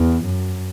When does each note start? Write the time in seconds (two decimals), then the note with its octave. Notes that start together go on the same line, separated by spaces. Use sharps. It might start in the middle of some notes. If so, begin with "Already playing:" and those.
Already playing: E2
0.25 F#2